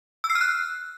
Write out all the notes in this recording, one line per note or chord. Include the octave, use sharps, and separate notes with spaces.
E6
C7
F6
F#6